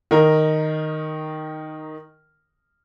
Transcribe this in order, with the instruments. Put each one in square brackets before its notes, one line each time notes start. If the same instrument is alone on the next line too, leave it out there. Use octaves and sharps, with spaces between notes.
[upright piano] D#3 D#4 A#4